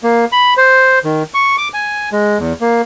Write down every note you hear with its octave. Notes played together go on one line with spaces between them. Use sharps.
A#3
B5
C5
D#3
C#6
D6
G#5
G#3
E2
A#3